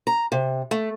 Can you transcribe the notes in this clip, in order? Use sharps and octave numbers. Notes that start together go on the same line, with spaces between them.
A#5
C3
A3